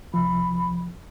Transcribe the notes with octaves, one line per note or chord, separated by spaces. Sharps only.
C2 F3 B5